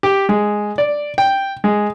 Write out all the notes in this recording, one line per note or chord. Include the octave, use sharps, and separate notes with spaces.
G4
G#3
D5
G5
G#3